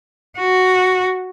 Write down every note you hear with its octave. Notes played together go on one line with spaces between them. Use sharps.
F#4